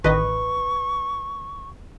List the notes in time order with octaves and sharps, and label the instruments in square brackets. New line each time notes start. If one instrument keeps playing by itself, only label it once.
[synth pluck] A1 D#3 D#5 [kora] B4 [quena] C#6